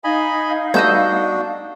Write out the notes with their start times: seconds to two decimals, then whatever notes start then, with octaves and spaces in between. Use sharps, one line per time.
0.04 D#4 D#5 F5 G#5 B5
0.74 G3 A3 B3 D4 F#4 D#5 E6 G6